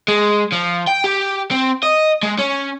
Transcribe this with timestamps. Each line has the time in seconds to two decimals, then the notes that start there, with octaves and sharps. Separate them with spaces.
0.08 G#3
0.52 F3
0.87 G5
1.04 G4
1.51 C4
1.83 D#5
2.23 G#3
2.39 C#4